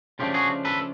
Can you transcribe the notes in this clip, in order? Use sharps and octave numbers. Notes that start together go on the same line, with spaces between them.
C#3 F3 A3 D4 F4 G4
F#4 G#4
A4 B4